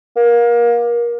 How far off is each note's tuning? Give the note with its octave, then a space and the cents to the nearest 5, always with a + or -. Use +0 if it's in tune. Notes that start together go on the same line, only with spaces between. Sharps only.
A#3 +25